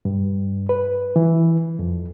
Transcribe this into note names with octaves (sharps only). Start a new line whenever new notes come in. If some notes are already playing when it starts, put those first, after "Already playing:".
G2
B4
E3
F2